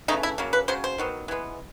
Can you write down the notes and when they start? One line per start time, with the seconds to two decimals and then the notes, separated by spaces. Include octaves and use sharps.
0.08 C#3 E3 A3 D#4
0.23 E4
0.38 C#3 F#3 A#3
0.53 B4
0.68 C#3 F#3 C5
0.84 C5
0.98 D#3 F#3 B3
1.28 E3 G#3 B3